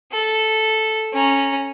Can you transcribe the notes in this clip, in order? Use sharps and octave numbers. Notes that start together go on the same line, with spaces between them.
A4
C#4 A#5